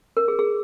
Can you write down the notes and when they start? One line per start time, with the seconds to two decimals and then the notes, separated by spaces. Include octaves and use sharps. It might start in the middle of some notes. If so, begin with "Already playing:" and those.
0.17 A#4
0.28 G#4
0.39 G#4